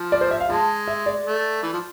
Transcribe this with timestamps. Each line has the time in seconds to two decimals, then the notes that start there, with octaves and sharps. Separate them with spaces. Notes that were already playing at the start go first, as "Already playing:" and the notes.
Already playing: F3
0.12 D5
0.21 C5
0.31 E5
0.40 F5
0.49 F3 G#3 A5
0.88 E5
1.06 D5
1.26 A3
1.63 E3
1.73 F3